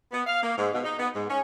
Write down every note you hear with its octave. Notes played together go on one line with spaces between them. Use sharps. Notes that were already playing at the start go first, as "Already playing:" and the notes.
B3
F5
A#3
G#2
B2
D#4
B3
G#2
C#4